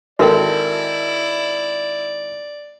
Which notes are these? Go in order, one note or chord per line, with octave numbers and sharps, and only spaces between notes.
G#1 E4 F#4 A4 A#4 D5 G5